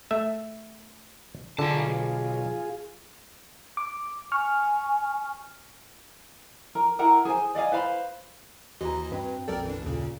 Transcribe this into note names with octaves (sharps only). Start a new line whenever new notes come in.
A3 E5
B1 D3 F4 G#4 A5
D6
G#5 C#6 F6
A#4 A#5
E4 A#4 F#5 A#5
G#4 C5 G#5
D5 D#5 F5 G#5
B4 C5 F5 B5
D#2 E3 F#4 D#5 A#5
G2 C4 B4
B1 F#2 A4 A#4 D5 G5
E3 D4
D#2 A#2 C#3